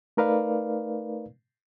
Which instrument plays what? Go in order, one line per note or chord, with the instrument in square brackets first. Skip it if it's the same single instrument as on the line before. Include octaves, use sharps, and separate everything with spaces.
[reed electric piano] A3 D#4 A#4 B4 D5 F5